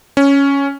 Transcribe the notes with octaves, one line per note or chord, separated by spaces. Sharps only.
C#4